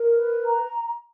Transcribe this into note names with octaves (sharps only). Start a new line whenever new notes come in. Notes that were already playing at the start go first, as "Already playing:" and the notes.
Already playing: A#4
B4
A#5